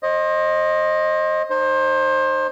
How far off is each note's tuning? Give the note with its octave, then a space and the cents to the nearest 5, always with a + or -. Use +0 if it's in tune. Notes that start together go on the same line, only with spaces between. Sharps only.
C5 +30 D#5 +0
D#4 -30 C5 +25